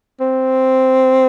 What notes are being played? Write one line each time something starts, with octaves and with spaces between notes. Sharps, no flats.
C4